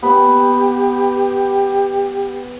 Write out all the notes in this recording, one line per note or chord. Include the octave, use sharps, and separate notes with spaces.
B3 G4 B5